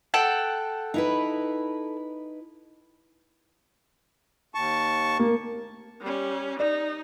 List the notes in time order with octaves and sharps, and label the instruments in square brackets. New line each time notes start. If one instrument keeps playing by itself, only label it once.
[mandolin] A4 F#5 G5
[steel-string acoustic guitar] D#4 E4 B4
[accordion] D#2 A5 C#6
[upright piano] A#3
[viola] G3 C#4
[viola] D#4 [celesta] D5